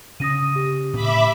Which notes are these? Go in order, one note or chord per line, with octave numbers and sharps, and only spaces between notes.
C#3 C#4 D#6 A#6 D#7
G4
A2 E5 B5 D6